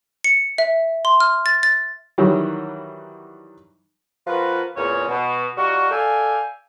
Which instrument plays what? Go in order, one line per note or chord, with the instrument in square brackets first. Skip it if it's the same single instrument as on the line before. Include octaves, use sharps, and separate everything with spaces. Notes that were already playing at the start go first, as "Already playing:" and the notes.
[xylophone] C#7
E5
C6
F6
A6
A6
[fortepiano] D#3 E3 F#3 G3
[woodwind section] F3 F4 F#4 A#4 B4
E2 A#2 C#3 G#3 C#4 C#5
B2
G3 D#4 F4 F#4
A4 D5 E5 F5 G5 G#5